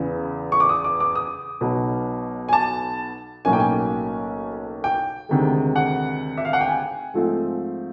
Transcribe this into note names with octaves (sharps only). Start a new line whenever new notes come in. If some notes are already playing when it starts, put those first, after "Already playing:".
Already playing: E2 C#3 E3
C#6
D6
D#6
D6
D6
D#6
B1 B2 F#3
G#5
A5
B1 A2 F#3 A#3 C#4 G#5
G5
G#5
G5
D2 C3 D#3 G#3
F#5
E5
F5
F#5
G5
G#5
G#2 F3 A3 C4